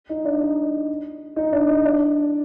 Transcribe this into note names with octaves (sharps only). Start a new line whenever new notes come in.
D#4 D#5
D4 D5
D#4 D#5
D#4 D#5
D4 D5
D#4 D#5
D4 D5